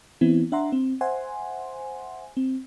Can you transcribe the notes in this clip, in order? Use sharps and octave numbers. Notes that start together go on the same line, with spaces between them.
E3 B3 C4 E4
D4 E5 F#5 A#5 C6
C4
C5 E5 F#5 G#5 C6
C4